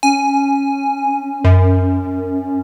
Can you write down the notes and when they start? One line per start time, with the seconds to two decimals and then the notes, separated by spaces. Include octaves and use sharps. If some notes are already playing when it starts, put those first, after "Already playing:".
0.03 C#4 G#5
1.45 F#2